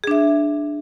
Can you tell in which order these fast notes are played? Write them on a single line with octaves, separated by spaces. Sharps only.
G#4 D4 E5